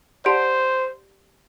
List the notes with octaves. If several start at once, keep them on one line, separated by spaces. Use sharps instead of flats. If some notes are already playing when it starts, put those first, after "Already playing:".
G4 C5 D5 F#5 A5 C6